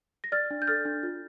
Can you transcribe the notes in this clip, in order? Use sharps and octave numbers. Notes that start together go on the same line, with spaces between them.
A#6
D5 F6 A6
D4
G6
A4 F6 A6
D4
F4